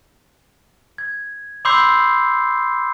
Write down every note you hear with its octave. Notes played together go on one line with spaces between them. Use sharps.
G#6
B5 C6 D6 E6 G6 C7